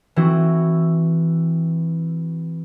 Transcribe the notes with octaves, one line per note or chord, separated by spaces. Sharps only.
E3 C4 F#4